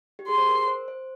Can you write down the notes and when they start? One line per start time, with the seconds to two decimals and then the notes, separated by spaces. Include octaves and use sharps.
0.19 G4
0.28 G#4 C6
0.38 C5
0.48 A#4
0.68 C5
0.88 C5